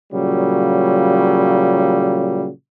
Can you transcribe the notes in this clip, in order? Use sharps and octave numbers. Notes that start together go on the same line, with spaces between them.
A#2 C#3 F#3 G3